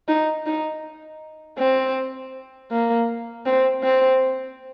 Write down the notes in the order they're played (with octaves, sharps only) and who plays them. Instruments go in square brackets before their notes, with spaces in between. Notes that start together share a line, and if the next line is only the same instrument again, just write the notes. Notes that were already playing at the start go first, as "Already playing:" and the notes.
[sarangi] D#4
D#4
C4
A#3
C4
C4